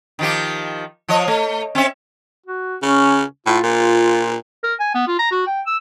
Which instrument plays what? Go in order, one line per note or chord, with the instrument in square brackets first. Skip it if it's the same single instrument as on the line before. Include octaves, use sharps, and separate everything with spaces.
[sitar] D#3 F3 G4
F3 C#5 D#5
A3
C4 C#4 E5
[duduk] F#4
[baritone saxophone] C#3 [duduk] C#4
[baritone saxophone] A2 [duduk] F4
[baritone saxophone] A#2 [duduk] F4
[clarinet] A#4
G#5
B3
F4
A#5
F#4
G5
E6